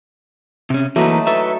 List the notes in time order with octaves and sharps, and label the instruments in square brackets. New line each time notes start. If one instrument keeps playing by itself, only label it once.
[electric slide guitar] C3 C#4
[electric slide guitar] E3 A#3 B4 [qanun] F#3 A3 D#4
[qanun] A4 C#6 [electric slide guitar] B4 E5